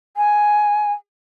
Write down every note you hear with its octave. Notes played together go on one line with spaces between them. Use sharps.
G#5